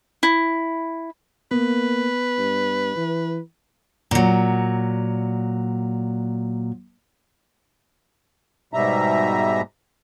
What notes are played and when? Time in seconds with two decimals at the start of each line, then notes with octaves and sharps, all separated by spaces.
0.23 E4
1.51 A#3 B3 B4
2.38 G2
2.96 E3
4.11 A#2 F#3
8.73 G#2 B2 G3 E5 A#5